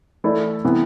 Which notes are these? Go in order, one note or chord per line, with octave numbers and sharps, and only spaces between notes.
E3 A3 E4 A4 D5
C3 E3 B3